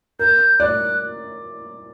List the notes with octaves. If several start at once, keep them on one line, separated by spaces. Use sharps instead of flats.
A#4 G6
D5 F#6